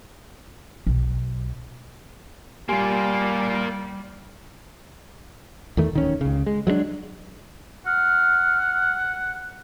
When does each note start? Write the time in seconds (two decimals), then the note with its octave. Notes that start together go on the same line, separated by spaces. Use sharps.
0.87 B1
2.69 G3 A#3 F4 G4 G#5 C6
5.77 E2 D#3 A3
5.93 D1 D#3 C#4
6.21 C#2 C#3
6.46 G#3
6.67 F#3 G#3 A3 D4
7.86 F#5 F6